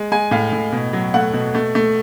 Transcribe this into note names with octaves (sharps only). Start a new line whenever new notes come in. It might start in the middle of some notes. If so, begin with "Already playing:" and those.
Already playing: G#3
G#3 G#5
A2 F5
A2
B2
F#3
A3 F#5
B2
A3
A3